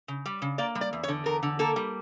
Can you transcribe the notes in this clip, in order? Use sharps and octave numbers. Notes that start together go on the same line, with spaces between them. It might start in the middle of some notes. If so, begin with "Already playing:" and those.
C#3
G3
C#3
A#3 D5
G3
D5
E2
C#5
D3
E2 A#4
D3
A#3 A4
G3